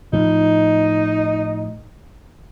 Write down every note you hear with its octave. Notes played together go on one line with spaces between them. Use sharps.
A2 F3 D#4